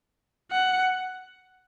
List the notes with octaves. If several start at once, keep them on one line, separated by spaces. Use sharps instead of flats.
F#5